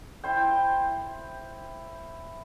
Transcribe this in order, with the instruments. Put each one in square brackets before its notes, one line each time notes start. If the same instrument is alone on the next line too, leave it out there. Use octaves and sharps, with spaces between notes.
[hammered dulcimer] E4 C5 G5